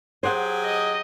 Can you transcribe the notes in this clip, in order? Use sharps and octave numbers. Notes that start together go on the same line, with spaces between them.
F#3 G4 G#4 C5 F#5
D#5